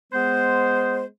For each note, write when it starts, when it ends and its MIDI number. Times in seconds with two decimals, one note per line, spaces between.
0.12 1.04 56
0.12 1.04 59
0.12 1.04 72